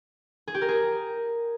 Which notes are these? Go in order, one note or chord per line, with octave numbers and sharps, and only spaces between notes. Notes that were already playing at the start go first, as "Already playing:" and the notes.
G#4
G4
A#4
G#4